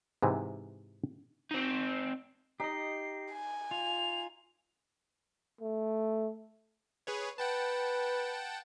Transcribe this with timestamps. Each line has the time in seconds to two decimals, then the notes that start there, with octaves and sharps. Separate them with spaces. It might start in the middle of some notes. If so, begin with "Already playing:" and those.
0.23 G#2 C3 E3
1.51 C4 D#4
2.60 D#4 G4 D#5 C7
3.32 G#5
3.71 F4 F7
5.61 A3
7.07 G#4 B4 C#5
7.38 B4 F#5 G5 A5